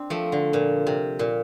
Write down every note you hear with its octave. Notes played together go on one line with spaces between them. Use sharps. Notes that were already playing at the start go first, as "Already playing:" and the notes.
Already playing: C4 D4
F3 A3
D3
A#2
C3
A#2